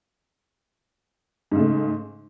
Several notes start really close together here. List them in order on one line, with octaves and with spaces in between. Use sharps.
G#2 C#3 A3